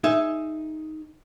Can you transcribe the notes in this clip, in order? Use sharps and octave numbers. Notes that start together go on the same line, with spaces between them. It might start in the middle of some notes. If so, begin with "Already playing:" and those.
D#4 G#4 E5